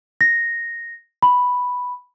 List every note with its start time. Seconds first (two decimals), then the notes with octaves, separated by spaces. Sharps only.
0.21 A#6
1.23 B5